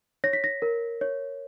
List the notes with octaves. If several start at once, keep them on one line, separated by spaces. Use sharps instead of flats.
C#5 A#6
B6
A#6
A#4
C#5